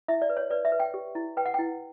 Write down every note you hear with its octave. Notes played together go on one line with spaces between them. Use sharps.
E4 E5
D5
B4
C#5
B4 D5
E5
B4
G5
G4
E4
B4 G5
F#5
E4 G5